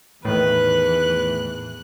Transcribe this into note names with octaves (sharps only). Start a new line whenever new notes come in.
E2 A2 D#3 B4 F#6